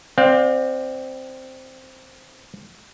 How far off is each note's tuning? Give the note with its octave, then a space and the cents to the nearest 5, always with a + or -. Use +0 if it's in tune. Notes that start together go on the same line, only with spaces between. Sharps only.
C4 +0 D5 +15 F5 +40